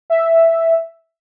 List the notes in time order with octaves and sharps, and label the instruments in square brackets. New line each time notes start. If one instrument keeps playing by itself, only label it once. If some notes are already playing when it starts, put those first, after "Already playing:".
[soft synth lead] E5